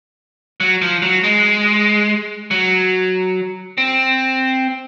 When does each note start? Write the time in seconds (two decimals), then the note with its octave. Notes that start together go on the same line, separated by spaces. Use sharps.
0.60 F#3
0.82 F3
1.02 F#3
1.24 G#3
2.51 F#3
3.78 C4